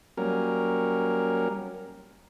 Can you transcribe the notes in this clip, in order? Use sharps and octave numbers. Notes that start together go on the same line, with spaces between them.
F#3 G3 A#3 C#4 A#4